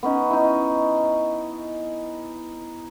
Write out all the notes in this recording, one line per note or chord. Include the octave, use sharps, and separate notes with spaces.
B3 C#4 D#4
D#4 E4